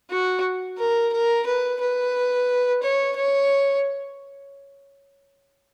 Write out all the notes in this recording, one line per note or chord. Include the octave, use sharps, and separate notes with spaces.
F#4
A#4
A#4
B4
B4
C#5
C#5